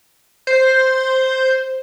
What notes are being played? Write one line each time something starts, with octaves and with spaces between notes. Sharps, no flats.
C5